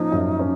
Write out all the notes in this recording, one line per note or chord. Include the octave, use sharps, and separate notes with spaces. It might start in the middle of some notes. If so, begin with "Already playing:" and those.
Already playing: F3 A#3 C#4 D#4
F#2
C#4